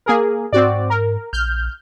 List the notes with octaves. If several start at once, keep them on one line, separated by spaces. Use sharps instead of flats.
A#3 G#4 A#4
G#2 C4 F#4 D5
A#4
A#1 F6 G6